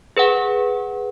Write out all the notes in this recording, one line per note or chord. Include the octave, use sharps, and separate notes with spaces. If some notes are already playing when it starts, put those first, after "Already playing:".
G#4 B4 F#5